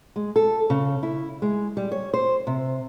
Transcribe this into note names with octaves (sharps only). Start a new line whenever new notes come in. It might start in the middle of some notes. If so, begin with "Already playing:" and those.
G#3
A4
C#3
E4
G#3
G3
C#5
C5
C3